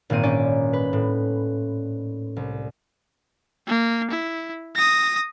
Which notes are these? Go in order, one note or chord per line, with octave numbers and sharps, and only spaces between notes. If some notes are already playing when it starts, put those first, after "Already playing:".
G#1 A#2 A#3 C4 D#7
C#4 D5
B4
A2
C2
A#3
E4
D#6 A#6